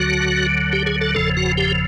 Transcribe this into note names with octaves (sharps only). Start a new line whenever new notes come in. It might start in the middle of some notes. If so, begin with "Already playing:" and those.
Already playing: D2 D3 F#3 F#4
G4
G#4
A4
F#1 E2 C#3 F3 A4
F#4
G4